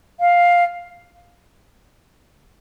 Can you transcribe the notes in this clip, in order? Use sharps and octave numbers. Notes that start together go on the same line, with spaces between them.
F5